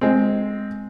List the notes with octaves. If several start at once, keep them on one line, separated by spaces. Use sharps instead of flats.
G#3 C4